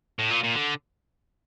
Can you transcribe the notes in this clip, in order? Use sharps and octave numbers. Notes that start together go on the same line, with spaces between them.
A2
A#2
A#2
D3